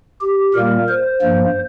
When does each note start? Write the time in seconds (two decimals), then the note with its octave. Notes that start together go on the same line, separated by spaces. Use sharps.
0.21 G4
0.54 A#2 G3 A#3 A#4
0.88 C5
1.21 G2 F3 A#3